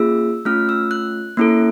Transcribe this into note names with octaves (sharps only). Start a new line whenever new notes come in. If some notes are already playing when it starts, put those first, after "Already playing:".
Already playing: A#3 C#4 F4 G#4 E6
A3 C#4 F4 F6
E6
F#6
A#3 C#4 E4 A4